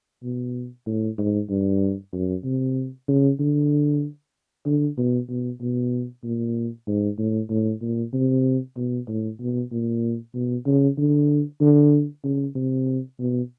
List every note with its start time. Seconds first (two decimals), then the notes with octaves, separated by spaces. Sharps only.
0.23 B2
0.86 A2
1.18 G#2
1.50 G2
2.13 F#2
2.44 C3
3.08 C#3
3.40 D3
4.66 D3
4.98 B2
5.29 B2
5.61 B2
6.24 A#2
6.87 G#2
7.18 A2
7.50 A2
7.82 A#2
8.14 C3
8.77 B2
9.08 A2
9.40 B2
9.72 A#2
10.35 B2
10.66 C#3
10.98 D3
11.61 D3
12.24 C#3
12.55 C3
13.19 B2